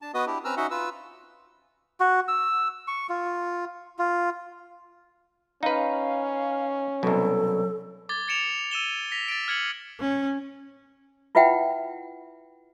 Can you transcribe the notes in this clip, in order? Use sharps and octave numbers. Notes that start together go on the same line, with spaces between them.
D4 A5
B3 F#4 B4 D#5 D#6
D4 E4 G4
C4 C#4 B4 A#5 E6 F6
C#4 D#4 F#4 D#5 E5 F#5
F4 B4 E6
F#4
E6
C#6
F4
F4
C#4 D#4 B4 F5
C2 B2 F#3 A4
D6 G#6 A6 G7
G#6 A6 C#7 D7 E7 F7
E6 D#7 E7 G7
A#6 B6 F7
A6 B6 D7
F6 G#6 C#7 F#7
C#4
E4 F4 B4 E5 F#5 G5